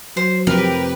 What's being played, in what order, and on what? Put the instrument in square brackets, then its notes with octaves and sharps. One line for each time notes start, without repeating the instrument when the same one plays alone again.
[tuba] F#3 [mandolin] C5
[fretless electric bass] F1 F3 C4 [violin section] G4 B4 [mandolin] A#4